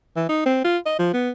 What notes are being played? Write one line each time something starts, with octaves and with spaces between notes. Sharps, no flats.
E3
D#4
C4
F4
D#5
F3
B3